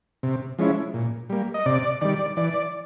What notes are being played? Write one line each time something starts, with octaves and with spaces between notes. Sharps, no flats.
C3
F3 G#3 C#4 E4
A#2
G3 A#3
D#5
C3 D5
D#3 G3 D5
E3 D5